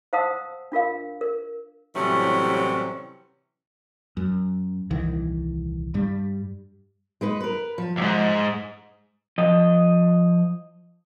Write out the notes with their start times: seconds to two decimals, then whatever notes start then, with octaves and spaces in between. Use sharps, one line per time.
0.13 C5 F5 F#5 A5 D#6 E6
0.72 D4 F4 A#4 F5
1.21 A#4
1.95 A2 C3 E3 F#3 G3 C#4
4.17 F#2
4.90 D#1 C2 D#3 E3
5.94 G2 G3
7.21 G#3 D#4 B4
7.40 A#4 B4
7.78 F3
7.97 D2 G#2
9.38 F3 D#5